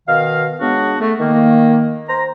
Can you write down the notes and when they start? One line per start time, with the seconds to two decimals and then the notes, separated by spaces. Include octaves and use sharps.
0.08 B2 D#3 D#5 F5
0.60 C#3 G#3 B3 D4 F#4
1.00 A3
1.19 D#3 A#3
2.09 C5 A#5